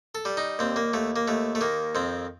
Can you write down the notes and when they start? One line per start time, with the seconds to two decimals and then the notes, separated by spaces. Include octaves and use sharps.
0.15 A4
0.25 G3
0.37 D#4
0.59 D#2 C4
0.76 A#3
0.94 D#2 A3
1.16 A#3
1.28 D#2 A3
1.55 A3
1.61 D#3 A#3
1.95 F2 C4